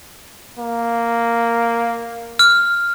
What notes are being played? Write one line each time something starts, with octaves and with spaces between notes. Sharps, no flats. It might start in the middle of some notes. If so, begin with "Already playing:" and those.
A#3
F6